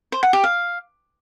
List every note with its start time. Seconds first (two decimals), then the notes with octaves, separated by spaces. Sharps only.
0.12 C5
0.23 F#5
0.33 G4
0.44 F5